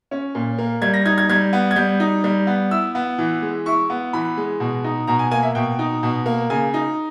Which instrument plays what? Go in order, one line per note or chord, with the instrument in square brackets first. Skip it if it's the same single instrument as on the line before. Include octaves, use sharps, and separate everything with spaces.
[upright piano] C#4
A#2
A#3
G3 G#6
A#6
D#4 G#6
G#6
G3 G#6
B3
G#6
G3 G6
D#4
G3
B3
E4 E6
B3
E3
G#3
E4 C#6
B3
E3 B5
G#3
B2
D#4
B2 A#5
G#5
A#3 G#5
E5
B2 G5
D#4
B2
A#3
C#3 G#5
D#4